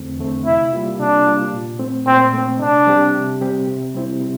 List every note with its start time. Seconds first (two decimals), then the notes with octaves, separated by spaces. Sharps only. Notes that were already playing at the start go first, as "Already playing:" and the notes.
Already playing: E2 D3 A3 C4
0.19 D3 A3 C4
0.46 C3 E4
0.73 G3 A#3 F4
1.00 C3 D4
1.27 G3 A#3 F4
1.53 A#2
1.80 A3 C4
2.06 A#2 C4
2.33 A3 C4
2.60 C3 D4
2.86 G3 C4 G4
3.14 C3
3.41 G3 C4 G4
3.67 C3
3.94 G3 C4 E4
4.20 C3